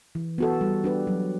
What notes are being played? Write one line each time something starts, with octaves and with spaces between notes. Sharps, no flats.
E3
B3 F#4 A4
G3
D4 G4 B4
F#3